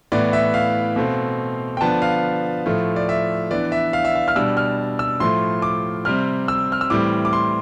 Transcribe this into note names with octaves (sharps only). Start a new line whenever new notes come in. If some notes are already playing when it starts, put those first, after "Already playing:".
A2 E3 B3 D5
E5
F5
B2 A3 C4
G5
D3 F3 B3 D4 A5
F5
A2 F3 A3
D5
E5
E3 B3 D4 D5
E5
F5
E5
F5
F6
B2 G3 D4 E6
F6
E6
A2 F3 A3 C6
D6
C3 G3 C4 F6
E6
F6
E6
A2 E3 G3 C4 D6
D6
C6